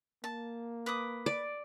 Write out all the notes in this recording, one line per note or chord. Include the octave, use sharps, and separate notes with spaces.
A#3 A5
B4 D6 D#6
D5